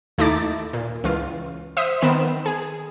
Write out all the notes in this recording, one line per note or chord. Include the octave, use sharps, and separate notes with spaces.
D#2 A3 D#4 E4 D6 A6
A#2
C#2 E3 F4
C5 E5 C6 D#6 E6 B6
D#3 B3 C4 B5 E7
G#4